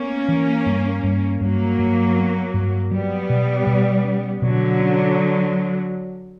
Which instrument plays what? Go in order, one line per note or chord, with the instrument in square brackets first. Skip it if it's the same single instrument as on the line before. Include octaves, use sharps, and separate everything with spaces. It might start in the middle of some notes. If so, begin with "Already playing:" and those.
Already playing: [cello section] A#3 C#4 [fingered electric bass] B3
[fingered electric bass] E3
G2
G2
[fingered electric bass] G2 [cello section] F#3 A#3
[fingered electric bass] G2
B3
G2
[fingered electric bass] F#3 [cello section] G3 B3
[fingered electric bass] B2
B2
C#4
[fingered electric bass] B2 [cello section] D3 F#3
[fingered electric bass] C#4